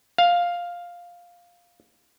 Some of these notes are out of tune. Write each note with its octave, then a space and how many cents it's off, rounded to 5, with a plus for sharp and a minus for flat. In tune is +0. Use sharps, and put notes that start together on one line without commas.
F5 +5